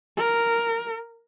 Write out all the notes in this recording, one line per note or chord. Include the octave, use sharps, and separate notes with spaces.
A#4